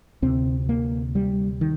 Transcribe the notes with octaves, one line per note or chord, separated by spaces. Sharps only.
D2 C3 C4
A#3
G3
D#3